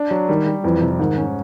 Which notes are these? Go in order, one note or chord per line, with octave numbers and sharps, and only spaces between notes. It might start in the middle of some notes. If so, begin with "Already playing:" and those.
Already playing: D4
F#3
D#3 G3
G3
F2 E3
C3
G#2 D#3
C#4